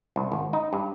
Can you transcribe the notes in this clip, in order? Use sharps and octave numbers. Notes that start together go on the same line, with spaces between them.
C2
G#1
D#4
G2